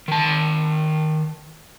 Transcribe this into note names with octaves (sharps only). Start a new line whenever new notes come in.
D#3 A5